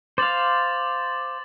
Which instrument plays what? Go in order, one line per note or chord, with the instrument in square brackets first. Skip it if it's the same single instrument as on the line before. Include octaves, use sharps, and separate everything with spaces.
[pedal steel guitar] C5 F5 [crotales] D6 A6 F#7